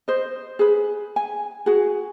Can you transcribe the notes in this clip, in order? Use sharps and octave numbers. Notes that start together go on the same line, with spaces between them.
C5 D#5
G#4 B4
G#5
F#4 G#4